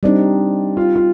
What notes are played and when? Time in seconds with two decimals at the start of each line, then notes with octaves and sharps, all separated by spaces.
0.03 G3 C4 D4 D#4
0.77 F4
0.96 F4